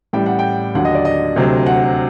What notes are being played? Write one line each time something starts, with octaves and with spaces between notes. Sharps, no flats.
A1 A2 G3 G5
F#5
G5
D#2 D3 F#3 F#5
D#5
D5
D#5
D2 C3 F#3
F#5